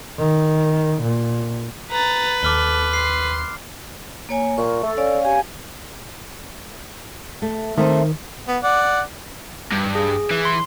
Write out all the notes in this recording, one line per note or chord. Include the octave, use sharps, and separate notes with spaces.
D#3
A#2
B4 A#5 A6
D#2 A4 D6 F6 G7
C6 C7
A#3 C#5 G#5
A#2 A#4 C#6
A3 A4
C#4 D5 F5
G4 F5 G#5
A3
D#3 A3 C4 D#4
B3
D5 F#5
G2
G#4
E3
C6